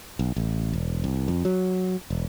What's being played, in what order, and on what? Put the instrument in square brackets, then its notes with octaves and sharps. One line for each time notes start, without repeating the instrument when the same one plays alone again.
[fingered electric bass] B1
A1
E1
C2
F2
F#3
E1